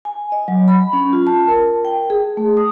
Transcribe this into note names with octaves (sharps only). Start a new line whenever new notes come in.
G#5
D#5
F#3
B5
C#4
F4
A5
A#4
G5
G#4
A3
D#6